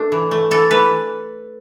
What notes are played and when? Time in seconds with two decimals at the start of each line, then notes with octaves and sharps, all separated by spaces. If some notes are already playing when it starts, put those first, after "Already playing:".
Already playing: A3 D4
0.12 E3
0.31 A3
0.51 E3 A4
0.71 E3 B4